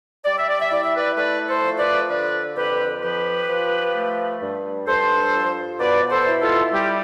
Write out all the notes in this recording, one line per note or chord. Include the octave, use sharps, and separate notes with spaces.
G3 D5
E5
D5
E5
E4 D5
E5
B4 D5
A3 B4 D5
A4 C5
F3
B4 D5
D3 B4 D5
F2 G4 B4
F3 G4 B4
F3
A3
G2
G2 A4 C5
F3
B2 B4 D5
A4 C5
E4
F4 A4
G3 G4